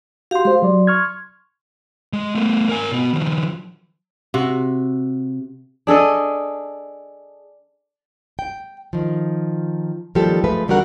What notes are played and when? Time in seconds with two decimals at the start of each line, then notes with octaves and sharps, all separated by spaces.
0.31 F#4 G4 F5 C6
0.45 G#3 C5 C6
0.62 F#3 D5
0.87 C#6 F6 G#6
2.13 G#3
2.35 A3 B3
2.69 A#4 G#5
2.91 B2 B3
3.13 D#3 F3
4.34 C3 F#4
5.87 D4 G#4 A4 D#5
8.39 G5
8.93 D#3 F3
10.15 D#3 F3 G3 A#3 G4 A4
10.44 F3 G#3 A3 B4
10.68 E2 D3 G3 F#4 A#4 F#5